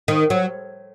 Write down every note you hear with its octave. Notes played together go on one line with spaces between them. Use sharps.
D#3
F#3